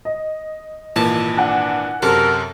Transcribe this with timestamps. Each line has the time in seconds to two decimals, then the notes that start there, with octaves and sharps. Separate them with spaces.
0.05 D#5
0.96 G#1 A#2 E3 A5
1.37 D4 F#5 G#5 F#6
2.02 F#2 C3 A4 A#4